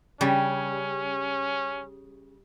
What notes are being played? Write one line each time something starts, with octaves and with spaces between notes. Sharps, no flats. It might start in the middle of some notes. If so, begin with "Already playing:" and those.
C#3 G3 C#4